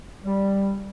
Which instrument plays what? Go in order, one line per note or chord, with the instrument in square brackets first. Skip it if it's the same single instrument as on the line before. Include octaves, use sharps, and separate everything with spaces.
[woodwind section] G3